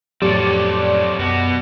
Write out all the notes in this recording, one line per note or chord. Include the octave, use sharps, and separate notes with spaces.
F2 A2 F#3 C4 G4 A4 C#5 D5
F#2 B2 F#4